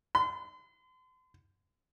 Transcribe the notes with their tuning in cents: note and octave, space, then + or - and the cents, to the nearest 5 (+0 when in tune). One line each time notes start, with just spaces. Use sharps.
C6 -40